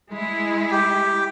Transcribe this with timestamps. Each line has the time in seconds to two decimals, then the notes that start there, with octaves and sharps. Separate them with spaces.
0.12 G#3 E4
0.71 G4